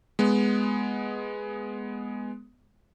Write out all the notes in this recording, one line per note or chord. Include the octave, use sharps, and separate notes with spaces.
G#3 B3